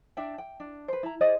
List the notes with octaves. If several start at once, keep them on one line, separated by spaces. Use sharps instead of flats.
D4 E5 G5
G5
D4
B4 C5
E4 A#5
G#4 C5 D5 D#5